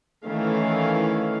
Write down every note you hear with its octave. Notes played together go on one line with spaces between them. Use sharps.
D#3 E3 A3 C#4 F5